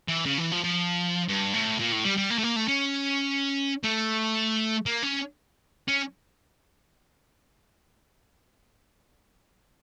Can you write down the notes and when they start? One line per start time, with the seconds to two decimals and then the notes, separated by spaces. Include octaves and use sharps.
0.08 E3
0.26 C#3
0.38 E3
0.52 F3
0.64 F3
1.29 G2
1.54 A2
1.79 A#2
1.92 A2
2.05 G3
2.17 G3
2.30 A#3
2.38 A3
2.43 A#3
2.56 A3
2.68 C#4
3.83 A3
4.86 A#3
5.03 C#4
5.88 C#4